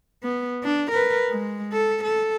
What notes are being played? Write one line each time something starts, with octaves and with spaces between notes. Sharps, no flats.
B3
D4
A#4 B4
G#3
A4
A4